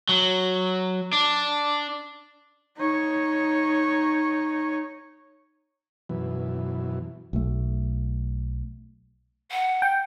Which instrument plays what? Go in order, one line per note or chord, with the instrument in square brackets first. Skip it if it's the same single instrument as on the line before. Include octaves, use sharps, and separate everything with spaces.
[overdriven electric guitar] F#3
D4
[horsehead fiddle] D#4 C#5
[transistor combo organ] F#2 B2 E3
[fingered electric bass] B1 A3
[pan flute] F#5
[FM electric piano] G5